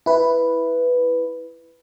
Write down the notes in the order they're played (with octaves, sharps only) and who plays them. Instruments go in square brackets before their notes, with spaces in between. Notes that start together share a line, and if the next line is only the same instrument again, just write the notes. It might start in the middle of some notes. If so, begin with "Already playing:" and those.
[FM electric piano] E4 B4